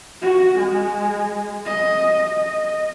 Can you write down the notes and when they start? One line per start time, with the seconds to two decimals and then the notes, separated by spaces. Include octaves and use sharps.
0.21 F#4
0.59 G#3
1.65 D#5
2.28 D#5